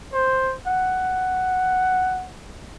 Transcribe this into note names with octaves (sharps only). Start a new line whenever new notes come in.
C5
F#5